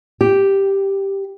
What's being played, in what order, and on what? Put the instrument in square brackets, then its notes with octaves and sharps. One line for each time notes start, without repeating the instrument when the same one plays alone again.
[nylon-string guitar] G4